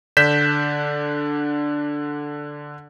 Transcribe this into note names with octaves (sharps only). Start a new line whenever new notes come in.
D3 D4 G6 B6 E7